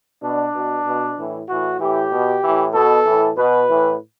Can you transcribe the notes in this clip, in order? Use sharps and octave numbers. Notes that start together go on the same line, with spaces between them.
B2 D4
B2
B2
A2 E3
A2 E3 F#4
A2 E3 G4
B2
A2 E3
B2 A4
A2 E3
B2 B4
A2 E3